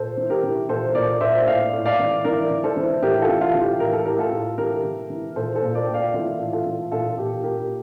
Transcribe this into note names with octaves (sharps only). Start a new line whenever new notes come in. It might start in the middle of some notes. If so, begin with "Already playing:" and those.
Already playing: A#2 A4 C5
E3
G4 A#4
E3
A#2 A4 C5
A#2 A#4 D5
A#2 C5 E5
A2 D5 F5
A2
D5 F5
E3
E3 A#4 D5
E3
A4 C5
E3
A2 G4 A#4
F4 A4
E3
F4
E3
G4
A2 A#4
A4
A2 G4 A#4
F4 A4
A2
E3 G4 A#4
E3
E3
A#2 A4 C5
A4 C5
A#2
A#4 D5
A#2 G5
D5 F5
E3 F4 A4
A2
F4 A4
E3
A#2 F4 A4
A#2 G4
A#2 G4 A#4